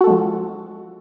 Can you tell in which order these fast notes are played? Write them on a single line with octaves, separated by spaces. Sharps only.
F#4 A4 G#3 F3